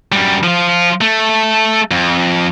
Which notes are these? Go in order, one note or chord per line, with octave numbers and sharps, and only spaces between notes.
F#2 G3
F3 F4
A3
F2